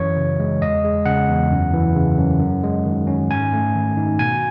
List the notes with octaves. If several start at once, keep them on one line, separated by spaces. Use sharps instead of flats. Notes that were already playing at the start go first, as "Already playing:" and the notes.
Already playing: F#2 E3 C#5
C#3
G#3
E2 D#5
G#3
C#3 F#5
E2
F#2
E3
C#3
F#2
F#2
G#3
D#3
C#4
G#2 G#5
A3
D#3
D#4
B2 G#5